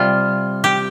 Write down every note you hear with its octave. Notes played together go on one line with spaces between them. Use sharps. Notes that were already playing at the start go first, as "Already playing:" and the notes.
Already playing: C3 G3 F4
G4